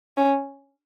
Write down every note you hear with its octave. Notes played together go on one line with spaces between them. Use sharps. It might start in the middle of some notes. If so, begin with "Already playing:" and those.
C#4